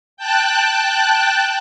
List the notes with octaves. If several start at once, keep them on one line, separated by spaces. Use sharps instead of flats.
G5 A5 F#6